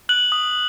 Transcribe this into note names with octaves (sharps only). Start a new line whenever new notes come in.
F#6 F#7
D#6